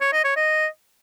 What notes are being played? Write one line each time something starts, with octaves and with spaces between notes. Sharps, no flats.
C#5
D#5
C#5
D#5